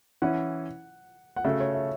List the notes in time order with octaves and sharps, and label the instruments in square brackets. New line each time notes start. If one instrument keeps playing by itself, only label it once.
[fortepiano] E3 C#4 E4 [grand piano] F#5
[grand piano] F#5
[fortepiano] C#3 A3 F#4 A4 [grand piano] E5
[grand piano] C#5
E5